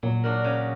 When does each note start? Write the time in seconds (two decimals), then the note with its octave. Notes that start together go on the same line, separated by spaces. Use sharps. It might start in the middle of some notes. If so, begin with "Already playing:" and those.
0.03 A#2 F#3
0.24 A#3 D4 F#4 A#4
0.44 C#3